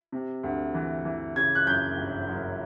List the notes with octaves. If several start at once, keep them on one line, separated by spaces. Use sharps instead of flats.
C3
D2
E3
E3
C#3 G#6
F#6
F#2 G6
G1
F#2